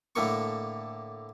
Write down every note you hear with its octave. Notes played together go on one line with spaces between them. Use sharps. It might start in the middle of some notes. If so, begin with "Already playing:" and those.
A2 D3 A#3 C#6